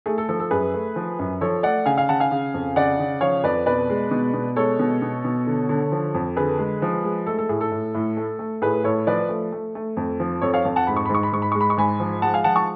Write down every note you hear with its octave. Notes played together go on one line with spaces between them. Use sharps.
A3 G#4
A4
F3 A4
A4
F#2 G#4 B4
A3
F3
F#2
F3 A4 C#5
A3 D5 F#5
C#3 F5 G#5
F5 G#5
C#3 F#5 A5
F5 G#5
C#3
F2
C#3 D5 F#5
C#3
F3 C#5 F5
F2 B4 D5
B2 B4 D5
G#3
B2
B2
G#3 A4 C#5
B2
B2
B2
D3
D3
F3
F2
D3 G#4 B4
G#3
F3
G#3
A3 A4
A4
A2 G#4
A4
A2
A2
A3
A3
A2 G#4 B4
A2 A4 C#5
F3 B4 D5
A3
A3
A3
F2
F3
F2 A4 C#5
C#5 F5
F2
F#5 A5
G#2 B5
C#6
G#2 B5
C#6
B5
G#2 C#6
B5
G#3 C#6
B5
C#6
G#2 G#5 B5
F3
G#3 F#5 A5
F5 G#5
F3 F#5 A5
A5 C#6